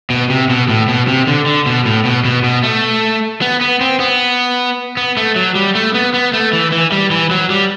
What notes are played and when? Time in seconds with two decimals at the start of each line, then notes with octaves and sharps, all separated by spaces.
0.10 B2
0.30 C3
0.50 B2
0.69 A2
0.88 B2
1.08 C3
1.27 D3
1.46 D3
1.66 B2
1.86 A2
2.05 B2
2.25 B2
2.44 B2
2.64 A3
3.41 B3
3.61 B3
3.81 C4
4.00 B3
4.97 B3
5.17 A3
5.36 F#3
5.55 G3
5.75 A3
5.94 B3
6.14 B3
6.33 A3
6.53 E3
6.72 E3
6.92 G3
7.11 E3
7.31 F#3
7.50 G3